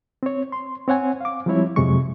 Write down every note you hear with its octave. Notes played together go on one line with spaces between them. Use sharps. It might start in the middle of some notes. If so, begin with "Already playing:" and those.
C4 C#5
C6
C4 C#5 F#5 G#5
F5 D6
F3 G3 G#3 C4 E4 C#5
F2 C3 F#3 G#3 C#6